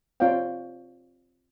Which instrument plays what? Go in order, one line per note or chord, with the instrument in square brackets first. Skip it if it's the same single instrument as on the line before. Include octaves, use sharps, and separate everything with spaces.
[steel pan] C4 F4 C#5 D5 F5 G5